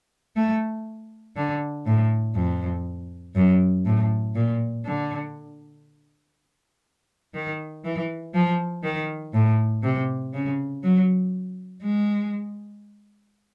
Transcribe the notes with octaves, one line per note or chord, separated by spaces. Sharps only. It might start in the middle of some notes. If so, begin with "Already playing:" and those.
A3
D3
A2
F2
F#2
A2
A#2
D3
D#3
E3
F3
D#3
A2
C3
C#3
F#3
G#3